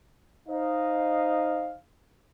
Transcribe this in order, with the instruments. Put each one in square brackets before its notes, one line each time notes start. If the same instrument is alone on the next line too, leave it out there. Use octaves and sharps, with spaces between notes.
[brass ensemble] D#4 C5 D#5 F5